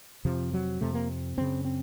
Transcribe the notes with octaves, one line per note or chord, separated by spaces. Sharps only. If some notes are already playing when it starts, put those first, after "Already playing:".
F2 C3 F3
F#3
F2 C3 A3
A#3
F#2 C#3 C4
C4